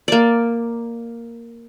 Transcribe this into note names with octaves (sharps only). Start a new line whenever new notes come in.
A#3 D5